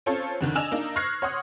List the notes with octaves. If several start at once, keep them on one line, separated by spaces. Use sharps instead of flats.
C4 C#4 F4 A4 C5 C#5
F2 D3 D#3
D4 D#5 G#5 E6 E7 F7
A#3 D4 D#4
C#6 F6 F#6 G#6 A#6 C7
C#5 F#5 C6 D#6